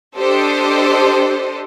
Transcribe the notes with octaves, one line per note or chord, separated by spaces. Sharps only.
D4 G4 A4 C5 D#5